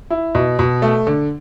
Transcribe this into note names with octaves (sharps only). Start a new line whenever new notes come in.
E4
B2
B2
A3
D3